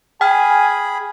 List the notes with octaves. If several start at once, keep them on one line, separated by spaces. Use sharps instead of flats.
G#4 G5 G#5 B5 F6